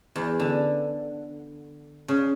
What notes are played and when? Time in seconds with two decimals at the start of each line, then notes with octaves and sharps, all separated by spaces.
0.16 E2
0.39 D3
2.08 C#3